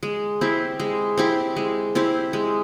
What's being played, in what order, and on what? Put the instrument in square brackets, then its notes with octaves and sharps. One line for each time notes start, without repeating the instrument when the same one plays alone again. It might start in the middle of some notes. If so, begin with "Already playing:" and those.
[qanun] G#3
C4 E4 G4
G#3
C4 E4 G4
G#3
C4 E4 G4
G#3